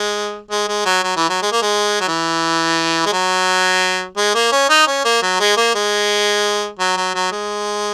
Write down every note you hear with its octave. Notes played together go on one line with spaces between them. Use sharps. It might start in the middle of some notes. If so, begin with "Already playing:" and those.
Already playing: G#3
G#3
G#3
F#3
F#3
E3
F#3
G#3
A#3
G#3
F#3
E3
G#3
F#3
G#3
A#3
C#4
D#4
C#4
A#3
F#3
G#3
A#3
G#3
F#3
F#3
F#3
G#3